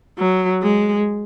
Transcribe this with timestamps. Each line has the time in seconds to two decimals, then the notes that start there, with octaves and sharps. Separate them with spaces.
0.18 F#3
0.62 G#3